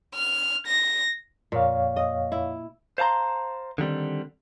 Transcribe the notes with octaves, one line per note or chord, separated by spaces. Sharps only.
F6
A#6
F2 A#2 C#5 F5
D#5
E4
C5 F5 A5 A#5 C6
D3 D#3 G3 C4